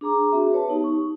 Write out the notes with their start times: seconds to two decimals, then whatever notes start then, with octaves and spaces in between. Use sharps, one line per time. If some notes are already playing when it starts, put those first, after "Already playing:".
0.01 D4 G#4 A#5 D6
0.32 C4 F#4 G#4 E5
0.53 B4 C#5 A5
0.68 B3 D#4 G4
0.84 D#4 C#6